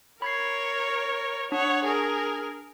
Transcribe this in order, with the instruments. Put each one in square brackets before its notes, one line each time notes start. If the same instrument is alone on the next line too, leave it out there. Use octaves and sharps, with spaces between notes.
[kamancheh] A#4 C#5 [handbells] B5 G#6 C7
[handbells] D4 [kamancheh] C#5 F#5
[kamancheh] G#4 A#4